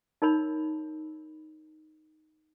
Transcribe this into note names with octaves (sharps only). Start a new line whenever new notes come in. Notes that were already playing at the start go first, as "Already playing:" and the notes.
D#4 A#4 C#5 B5